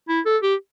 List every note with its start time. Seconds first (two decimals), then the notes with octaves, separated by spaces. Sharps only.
0.09 E4
0.26 A4
0.43 G4